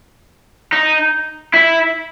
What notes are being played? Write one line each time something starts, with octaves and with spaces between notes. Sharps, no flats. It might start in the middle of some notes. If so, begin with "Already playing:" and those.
D#4
E4